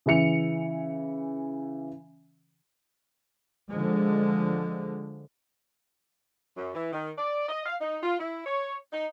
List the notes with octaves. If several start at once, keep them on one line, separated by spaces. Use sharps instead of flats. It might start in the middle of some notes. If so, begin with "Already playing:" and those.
C#3 E3 E5 C#7 F7
D3 F3 G#3
F#2
E3
D#3
D5
D#5
F5
D#4
F4
E4
C#5
D#4